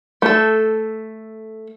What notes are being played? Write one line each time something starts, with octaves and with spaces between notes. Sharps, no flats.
A3 A4